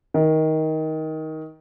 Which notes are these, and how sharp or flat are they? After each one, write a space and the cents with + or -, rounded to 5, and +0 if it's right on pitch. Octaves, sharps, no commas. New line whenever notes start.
D#3 +15